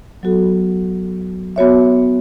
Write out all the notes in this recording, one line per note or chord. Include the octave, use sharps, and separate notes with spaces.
F#3 B3 F#4 A4
B3 F#4 C#5 E5